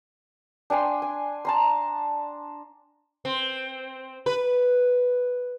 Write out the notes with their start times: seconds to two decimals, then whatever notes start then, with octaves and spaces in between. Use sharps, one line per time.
0.70 D4 G5 G#5 C6
1.02 G#5
1.45 A5 A#5 C6
3.25 C4
4.26 B4